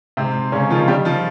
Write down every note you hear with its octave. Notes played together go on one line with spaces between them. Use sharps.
G#2 C3 C4
G#2
G#2 C#3 C#4
D#3 F3 F4
D#3 G3 G4
F3 F4